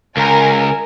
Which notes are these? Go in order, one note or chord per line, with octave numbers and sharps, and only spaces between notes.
C#2 A#4 G#5